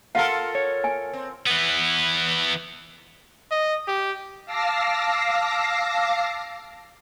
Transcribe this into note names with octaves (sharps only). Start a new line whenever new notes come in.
F4 A4 A#4 F5 F#5
C#5
G#5
C4
E3 B3
D#5
G4
F5 A5 D6 E6 A#6 C7